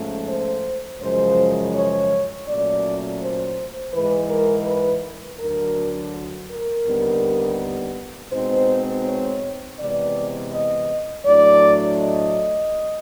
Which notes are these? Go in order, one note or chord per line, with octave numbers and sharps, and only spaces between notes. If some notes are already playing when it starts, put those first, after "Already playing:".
Already playing: G#2 F3 A3 C#4
C5
F#2 C#3 F3 G#3 C5
C#5
A#2 F#3 A3 C#4 D5
C5
G#2 E3 G#3 B4
A#4
B4
D2 D3 F#3 A#4
A#4
D#2 D3 G3 B3 D#4
B2 G#3 C4 D#4 C5
C#5
C3 E3 G#3 B3 D5
D#5
A2 F#3 A3 D4 D5
D#5